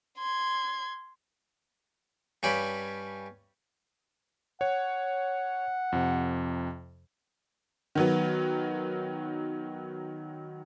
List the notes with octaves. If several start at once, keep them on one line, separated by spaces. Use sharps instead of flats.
C6 G#6
G2 C#4 G4 B5
C#5 F#5
F2 C3
D#3 F#3 B3